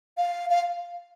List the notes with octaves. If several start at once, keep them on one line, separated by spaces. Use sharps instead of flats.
F5
F5